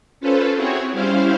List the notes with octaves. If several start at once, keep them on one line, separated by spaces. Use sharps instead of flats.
C#4 F4 A4 B4 C5
C4 E4 F#4 G#4 C#5
G3 C#4 E4 C5 F5